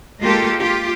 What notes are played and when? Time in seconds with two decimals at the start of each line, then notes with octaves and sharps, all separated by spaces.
0.21 G#3 A#3 F4 G4 A4
0.59 F4 G4